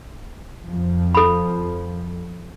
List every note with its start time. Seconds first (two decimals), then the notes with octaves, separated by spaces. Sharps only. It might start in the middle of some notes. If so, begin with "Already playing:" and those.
0.66 F2 F3
1.15 A4 B5